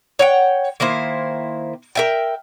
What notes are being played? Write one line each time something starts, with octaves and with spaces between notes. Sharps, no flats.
C#5 F#5 G5
D#3 A#3 E4 C5
A#4 E5 G5